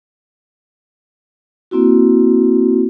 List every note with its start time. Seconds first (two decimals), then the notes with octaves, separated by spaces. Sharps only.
1.71 A#3 C4 E4 F#4